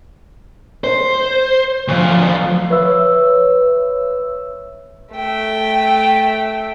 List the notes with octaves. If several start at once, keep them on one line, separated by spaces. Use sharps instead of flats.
C5
D2 F3
B4 C#5 E5 E6
A3 G5